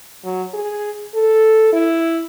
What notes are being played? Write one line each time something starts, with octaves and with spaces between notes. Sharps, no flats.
F#3
G#4
A4
E4